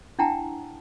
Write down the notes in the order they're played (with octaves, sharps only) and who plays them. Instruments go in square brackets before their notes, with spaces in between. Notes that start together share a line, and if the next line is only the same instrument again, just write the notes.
[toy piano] D4 E4 F#5 G5 A5 A#5